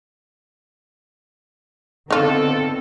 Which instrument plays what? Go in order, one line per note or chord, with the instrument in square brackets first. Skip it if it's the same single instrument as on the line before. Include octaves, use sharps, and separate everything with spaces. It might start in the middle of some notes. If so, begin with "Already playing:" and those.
[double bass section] D3 B3 [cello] C4 [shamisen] D#4 F4 [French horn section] A4